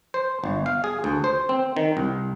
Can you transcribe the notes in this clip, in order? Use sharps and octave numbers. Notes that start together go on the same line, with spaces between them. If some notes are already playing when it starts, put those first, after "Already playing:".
C5
G1
F5
G#4
D2
C5
C4
D#3
C2